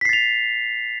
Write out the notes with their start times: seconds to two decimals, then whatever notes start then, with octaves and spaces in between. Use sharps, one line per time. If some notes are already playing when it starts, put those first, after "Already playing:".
0.01 B6
0.05 C7
0.09 A6
0.13 F7